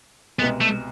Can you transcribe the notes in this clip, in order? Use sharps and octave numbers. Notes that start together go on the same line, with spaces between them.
C2 B2 G#3 B3
A3